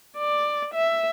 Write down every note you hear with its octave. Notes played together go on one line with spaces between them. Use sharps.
D5
E5